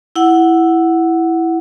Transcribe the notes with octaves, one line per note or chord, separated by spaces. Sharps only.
E4 F#5